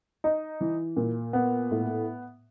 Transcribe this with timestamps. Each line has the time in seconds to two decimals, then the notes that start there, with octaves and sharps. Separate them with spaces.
0.24 D#4
0.61 E3
0.97 A#2
1.33 B3
1.71 A2